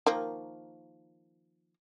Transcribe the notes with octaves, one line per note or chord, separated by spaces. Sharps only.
D#3 F3 A#3